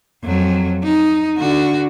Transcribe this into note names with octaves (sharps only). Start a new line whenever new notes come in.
F2 F#3
D#4
D3 F#4